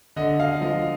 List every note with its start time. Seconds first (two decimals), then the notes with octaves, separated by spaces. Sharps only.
0.16 D3 D#5
0.40 F5
0.61 F3 D#5